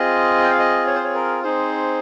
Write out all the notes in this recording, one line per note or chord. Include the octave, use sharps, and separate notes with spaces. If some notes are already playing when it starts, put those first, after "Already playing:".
Already playing: C4 F4 G#4 D#5
G5
F5
D#5
C#5
C5
C#5
A#4
C4 D#4 G#4 C5